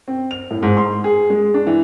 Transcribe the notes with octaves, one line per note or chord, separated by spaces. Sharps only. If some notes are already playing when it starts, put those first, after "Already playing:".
C4
F7
A2
G#2
C6
G#4
G#3
D4
E3